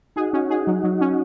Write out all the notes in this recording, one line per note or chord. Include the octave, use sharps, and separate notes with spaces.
D#4 F#4 G#4
C#4
G#4
F#3
F#3
C#4